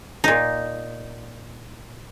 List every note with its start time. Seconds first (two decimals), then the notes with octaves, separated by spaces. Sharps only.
0.24 A#2 D#4